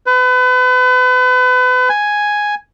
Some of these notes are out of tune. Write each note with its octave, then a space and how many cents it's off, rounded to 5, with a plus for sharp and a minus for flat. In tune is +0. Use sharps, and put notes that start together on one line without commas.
B4 +35
G#5 +0